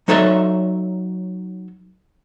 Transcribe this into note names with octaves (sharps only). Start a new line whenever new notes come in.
F#3 D#4 A4 C#5 D5 E5